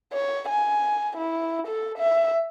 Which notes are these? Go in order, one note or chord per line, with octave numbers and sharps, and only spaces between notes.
C#5
G#5
E4
A4
E5